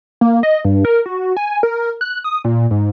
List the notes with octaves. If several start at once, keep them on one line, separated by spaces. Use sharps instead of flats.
A#3
D#5
G2
A#4
F#4
G#5
A#4
F#6
D#6
A#2
G#2